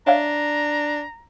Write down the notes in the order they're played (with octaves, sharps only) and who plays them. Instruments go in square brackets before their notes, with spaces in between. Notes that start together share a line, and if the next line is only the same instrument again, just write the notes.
[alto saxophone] D4 [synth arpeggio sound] C#5 E5 F5 [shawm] A#5